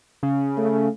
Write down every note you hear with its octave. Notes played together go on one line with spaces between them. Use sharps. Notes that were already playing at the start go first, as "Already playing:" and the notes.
C#3
A3